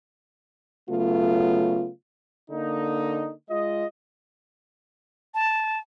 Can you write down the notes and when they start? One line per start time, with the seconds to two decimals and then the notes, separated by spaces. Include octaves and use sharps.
0.89 C#3 F#3 A3 B3 F4
2.50 D3 A#3 D#4
3.49 G#3 F4 D#5
5.35 A5